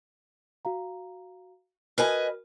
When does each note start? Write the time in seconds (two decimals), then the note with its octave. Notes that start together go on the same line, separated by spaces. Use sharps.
0.65 F#4 F5 A#5
1.98 F#4 A#4 B4 D#5 G#5 F6